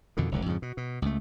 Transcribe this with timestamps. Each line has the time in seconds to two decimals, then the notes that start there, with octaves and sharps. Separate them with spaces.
0.17 F2 B2 D3 D#3
0.31 F1 C#2 D3
0.46 F2 G#2 C#3
0.62 B2
0.77 B2
1.02 C#2 A3